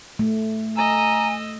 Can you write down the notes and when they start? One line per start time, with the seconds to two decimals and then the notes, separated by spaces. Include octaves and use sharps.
0.19 A3
0.76 D#5 G#5 A#5 E6